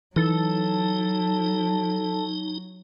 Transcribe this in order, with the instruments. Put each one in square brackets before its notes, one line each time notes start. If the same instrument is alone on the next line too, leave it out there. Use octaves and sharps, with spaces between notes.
[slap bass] E3 [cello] F#3 [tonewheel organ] D#4 [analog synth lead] A4